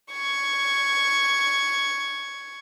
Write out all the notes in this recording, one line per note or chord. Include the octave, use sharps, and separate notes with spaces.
C#6 G#6